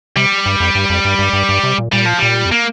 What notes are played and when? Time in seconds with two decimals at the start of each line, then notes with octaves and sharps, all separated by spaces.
0.16 C3 G3
0.46 G2
0.60 F2
0.75 G2
0.90 F2
1.05 G2
1.19 G2
1.33 G2
1.49 G2
1.64 C3
1.78 A#2
1.92 A#2 G3
2.06 F3
2.19 A#2 G3
2.45 F2
2.52 A#3